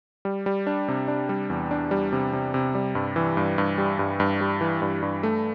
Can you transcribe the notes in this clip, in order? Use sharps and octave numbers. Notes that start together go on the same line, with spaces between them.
G3
G3
D4
C3
D4
G3
E2
D4
G3
C3
C3
C3
G3
G2
E3
G2
G2
G3
G2
G2
G3
E3
G2
G2
A3